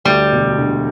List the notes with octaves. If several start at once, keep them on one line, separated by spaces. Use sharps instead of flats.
D2 G3
E1
D3